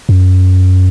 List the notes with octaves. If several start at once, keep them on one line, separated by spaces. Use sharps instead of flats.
F#2